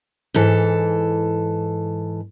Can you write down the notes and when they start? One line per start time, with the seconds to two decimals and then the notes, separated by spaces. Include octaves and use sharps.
0.34 G#2 E3 A4